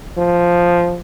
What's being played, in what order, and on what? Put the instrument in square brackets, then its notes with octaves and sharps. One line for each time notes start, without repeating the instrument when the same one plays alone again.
[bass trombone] F3